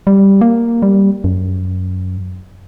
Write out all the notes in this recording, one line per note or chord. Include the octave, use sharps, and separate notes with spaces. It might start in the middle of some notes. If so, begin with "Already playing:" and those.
G3
A#3
G3
F#2